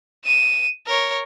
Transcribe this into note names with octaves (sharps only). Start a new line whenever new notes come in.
D#7 E7
A#4 C#5